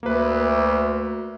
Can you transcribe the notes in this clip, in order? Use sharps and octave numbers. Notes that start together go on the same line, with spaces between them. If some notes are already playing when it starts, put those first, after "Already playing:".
D2 A#3 B4